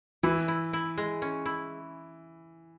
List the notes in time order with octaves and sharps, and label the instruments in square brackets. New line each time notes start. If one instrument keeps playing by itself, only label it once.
[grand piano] E3 [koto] E4
[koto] E4
E4
G#3
C#4
E4